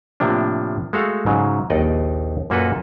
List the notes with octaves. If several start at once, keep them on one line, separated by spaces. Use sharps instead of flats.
A2 C3 F3 A#3 D4
G#3 A3 F#4 A4 F5
G#2 C#3 F#3
A#1 D#2 D#4 D5 D#5
F#2 A#2 A#3 F#4 A4 B4